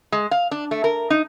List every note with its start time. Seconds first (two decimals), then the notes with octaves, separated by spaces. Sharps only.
0.12 G#3
0.31 F5
0.51 D4
0.71 A3
0.84 A#4
1.10 D#4